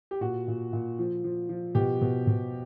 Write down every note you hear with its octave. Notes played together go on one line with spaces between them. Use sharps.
G4
A#2 F#4
A#2
A#2
F3
F3
F3
B2 G4
B2
B2